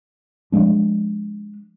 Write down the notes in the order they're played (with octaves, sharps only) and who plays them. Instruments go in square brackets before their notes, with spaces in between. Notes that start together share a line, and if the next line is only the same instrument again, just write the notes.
[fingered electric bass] F3 G#3 D4